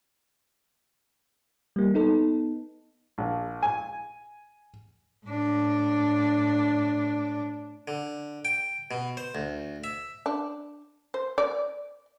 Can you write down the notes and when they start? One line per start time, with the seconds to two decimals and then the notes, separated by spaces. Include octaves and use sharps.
1.76 G3 A#3
1.94 B3 D#4 A4
3.18 A#1
3.63 G#5
5.27 A2 D4
7.88 D3
8.45 G5
8.91 B2
9.17 C5
9.35 D2
9.84 E5
10.26 D4
11.14 C5
11.38 D5